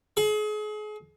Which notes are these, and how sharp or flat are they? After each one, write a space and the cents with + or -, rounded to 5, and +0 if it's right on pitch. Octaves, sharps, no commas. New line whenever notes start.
G#4 +35